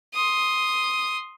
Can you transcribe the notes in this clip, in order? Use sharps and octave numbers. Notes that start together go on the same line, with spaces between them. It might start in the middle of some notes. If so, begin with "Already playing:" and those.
C6 D#6